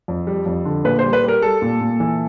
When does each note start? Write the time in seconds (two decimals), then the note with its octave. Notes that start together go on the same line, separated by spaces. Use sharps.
0.08 F2
0.27 G3
0.46 F2
0.65 D3
0.85 A#2 B4
0.99 G3 C5
1.13 B4
1.23 G3
1.28 A#4
1.42 G3 A4
1.62 A#2
1.81 A#2
2.00 E3